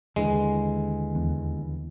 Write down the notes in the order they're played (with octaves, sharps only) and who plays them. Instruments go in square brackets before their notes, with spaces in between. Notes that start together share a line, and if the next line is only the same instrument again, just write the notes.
[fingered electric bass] D#2 D3 E3 [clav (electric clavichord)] G#3
[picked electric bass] E2